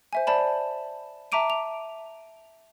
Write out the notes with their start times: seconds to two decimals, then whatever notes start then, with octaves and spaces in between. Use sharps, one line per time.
0.13 C5 E5 G#5
0.27 C5 D5 A5 B5
1.32 E5 A5 A#5 D6 D7 D#7
1.50 F7